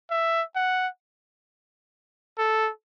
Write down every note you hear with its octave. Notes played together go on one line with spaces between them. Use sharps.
E5
F#5
A4